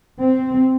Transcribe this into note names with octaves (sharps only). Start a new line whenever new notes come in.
C4